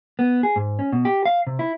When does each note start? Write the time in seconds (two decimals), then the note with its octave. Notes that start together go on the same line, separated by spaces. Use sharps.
0.19 B3
0.43 G#4
0.56 G#2
0.79 C#4
0.93 B2
1.05 G4
1.25 F5
1.47 C3
1.59 E4